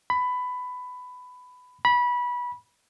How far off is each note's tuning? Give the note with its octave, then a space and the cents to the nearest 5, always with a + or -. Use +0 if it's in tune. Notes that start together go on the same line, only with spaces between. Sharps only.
B5 +15
B5 -20